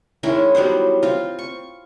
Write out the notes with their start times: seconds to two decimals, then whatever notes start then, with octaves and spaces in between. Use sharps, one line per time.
0.23 D#3 G#3 C#4 E4
0.55 F#3 G3 B3 C5
1.03 C4 F4
1.39 C#6